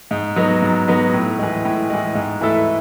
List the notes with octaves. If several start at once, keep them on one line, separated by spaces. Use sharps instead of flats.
G#2
F#3 B3 D#4
G#2
F#3 B3 D#4
A2
E3 G#3
A2
E3 G#3
G#2
E3 A3 E4 A4